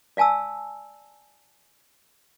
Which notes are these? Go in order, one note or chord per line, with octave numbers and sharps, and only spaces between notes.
D5 F5 G#5 A5 E6